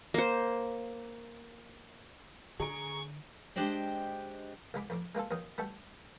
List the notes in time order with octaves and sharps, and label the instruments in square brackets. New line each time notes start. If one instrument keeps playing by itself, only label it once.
[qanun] A#3 C5
[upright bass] D3 [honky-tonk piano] G#4 A#5 D7 [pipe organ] C#6
[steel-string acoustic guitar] G#3 D4 G4 C5 D#5 G5
[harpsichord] C2 G#3 B5 D6
F2 A2 D6
G#3 A#3 F4 A4
D#2 D#3 F#3 D#6
G3 A3 F#4 A4